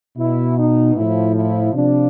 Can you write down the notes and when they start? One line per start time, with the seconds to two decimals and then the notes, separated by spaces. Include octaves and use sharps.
0.18 B2 E4
0.58 D#4
0.96 A2 F3 E4
1.34 E4
1.74 C3 F3 D4